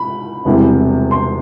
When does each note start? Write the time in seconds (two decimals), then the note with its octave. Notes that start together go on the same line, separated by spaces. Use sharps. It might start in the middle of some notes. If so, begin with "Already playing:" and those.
Already playing: B5
0.45 E1 E2 C3 E3 G3
1.11 C6